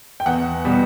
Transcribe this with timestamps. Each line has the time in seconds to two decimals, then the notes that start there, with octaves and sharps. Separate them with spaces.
0.20 G5
0.26 E2 F#5
0.65 B2 G3